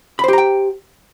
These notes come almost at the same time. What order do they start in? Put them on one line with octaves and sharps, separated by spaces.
B5 C5 G4 A#5 G5